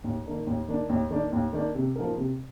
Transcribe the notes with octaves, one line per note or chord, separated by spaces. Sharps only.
D#2
D#3 A#3 D4
D#2
D#3 A#3 D4
D#2
D#3 A#3 D4
D#2
D#3 A#3 D4
C3
F3 A#3 D#4 A#4
C3